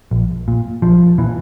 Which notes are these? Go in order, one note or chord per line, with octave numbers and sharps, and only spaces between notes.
A#1
A#2
A#1 F3
A#2 E3